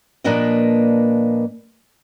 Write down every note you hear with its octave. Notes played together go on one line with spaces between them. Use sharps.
A#2 F3 A#3 D4 B4 D#5